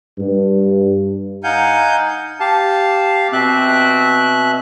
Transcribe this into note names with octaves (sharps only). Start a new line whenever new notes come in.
G2
D#4 F5 F#5 G#5 G6
G4 F5 A5
B2 C4 E5 F#6